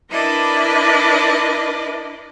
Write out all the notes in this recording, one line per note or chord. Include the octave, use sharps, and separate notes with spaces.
D4 E4 A#4 B4 D5 D#5